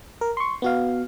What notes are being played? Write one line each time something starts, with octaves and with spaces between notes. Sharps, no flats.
A#4
C6 C#6
B3 F#4 F5